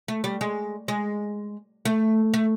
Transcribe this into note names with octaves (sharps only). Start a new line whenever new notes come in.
A3
G3
G#3
G#3
A3
A3